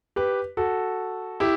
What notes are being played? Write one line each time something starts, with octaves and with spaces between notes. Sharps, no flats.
G4 B4
F#4 A4
E4 G4